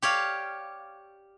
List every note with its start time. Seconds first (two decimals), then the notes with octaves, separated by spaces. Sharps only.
0.02 G4 C#5 D5 F5